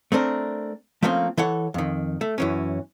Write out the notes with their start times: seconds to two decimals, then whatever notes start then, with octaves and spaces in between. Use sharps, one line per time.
0.12 A3 C4 D4 A#4
1.02 F3 A3 A#3 C4 C#4 F4
1.37 E3 A4 C#5 F#5
1.74 F2 D#3
2.21 A3
2.38 F#2 E3 C#4